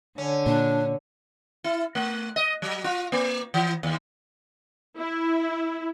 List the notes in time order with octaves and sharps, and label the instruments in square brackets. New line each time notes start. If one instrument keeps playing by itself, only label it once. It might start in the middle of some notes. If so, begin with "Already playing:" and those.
[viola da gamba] D3 [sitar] C#4
[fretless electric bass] A#2 [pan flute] D4
[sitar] E4
A3
D#5
F#3
F4
A#3
E3
D#2
[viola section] E4